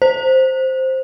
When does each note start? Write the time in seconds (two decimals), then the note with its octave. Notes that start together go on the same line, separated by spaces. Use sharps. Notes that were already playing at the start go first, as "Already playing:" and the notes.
0.02 C5